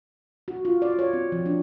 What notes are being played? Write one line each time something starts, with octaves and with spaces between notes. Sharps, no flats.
F#4
F4
D5
C#5
C4
F3
D4